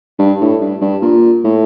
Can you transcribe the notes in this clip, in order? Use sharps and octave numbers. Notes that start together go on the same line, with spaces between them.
G2
A2
G2
G2
A#2
A2